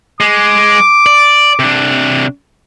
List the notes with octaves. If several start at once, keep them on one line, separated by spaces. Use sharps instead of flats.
G#3 D6
D5
C3 D4